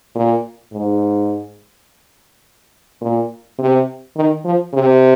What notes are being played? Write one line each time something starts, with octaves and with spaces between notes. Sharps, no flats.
A#2
G#2
A#2
C3
D#3
F3
C3